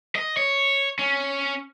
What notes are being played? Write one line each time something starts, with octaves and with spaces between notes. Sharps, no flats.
D#5
C#5
C#4